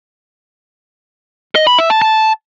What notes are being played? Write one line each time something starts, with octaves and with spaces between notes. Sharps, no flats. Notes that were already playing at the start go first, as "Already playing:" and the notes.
D#5
B5
E5
A5
A5